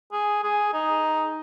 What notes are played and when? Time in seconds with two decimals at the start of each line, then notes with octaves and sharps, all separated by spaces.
0.13 G#4
0.44 G#4
0.73 D#4